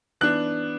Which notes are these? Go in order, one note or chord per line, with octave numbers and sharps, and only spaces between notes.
E3 B3 D4 F#6